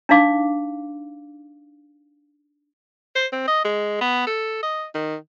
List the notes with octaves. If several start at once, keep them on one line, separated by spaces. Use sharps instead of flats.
D4 D#4 F5 D6
C5
C4
D#5
G#3
B3
A4
D#5
D#3